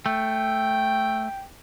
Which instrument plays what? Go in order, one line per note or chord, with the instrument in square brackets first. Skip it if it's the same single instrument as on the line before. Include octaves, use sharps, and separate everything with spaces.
[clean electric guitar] A3 [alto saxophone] G5